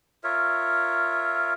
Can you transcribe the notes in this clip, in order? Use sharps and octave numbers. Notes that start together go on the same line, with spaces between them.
F4 A#4 C#5 E5